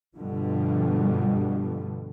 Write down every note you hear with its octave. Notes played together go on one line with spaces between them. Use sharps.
G2 B2 D3 F3 G3